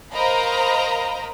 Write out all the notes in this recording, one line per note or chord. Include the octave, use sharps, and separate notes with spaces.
A#4 C5 D#5 F5 A#5 B5